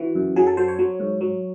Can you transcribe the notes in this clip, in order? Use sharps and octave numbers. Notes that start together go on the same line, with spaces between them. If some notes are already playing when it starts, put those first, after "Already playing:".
Already playing: E3 F#4
F#2
F#3 G#4
A4
F#3 C5
C#5
F#3
G#2
F#3